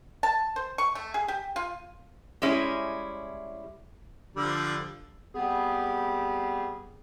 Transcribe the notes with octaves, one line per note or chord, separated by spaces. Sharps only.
A5
C5
C#6
A3
G#4
G4
F4
G3 G#3 C#4 E4
D3 F3 G3
G3 B3 C4 G4 G#4